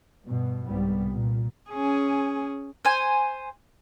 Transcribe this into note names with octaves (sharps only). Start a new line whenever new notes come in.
G2 B2
C2 G#2 G3 B3
A#2
C#4 G#4
C5 G#5